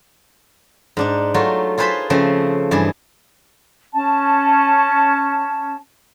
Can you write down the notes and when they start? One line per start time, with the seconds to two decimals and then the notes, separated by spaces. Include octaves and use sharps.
0.97 G#2 D4 D#4
1.34 F#3 A3 D#4 F4
1.78 F4 G#4 B4 C5 A5 B5
2.10 C#3 F3 A3 C4
2.71 G2 E3 G#4 A5
3.93 C#4 A5